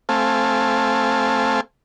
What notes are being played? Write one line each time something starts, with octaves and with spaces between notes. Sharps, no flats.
A3 C4 F5 G#5 A5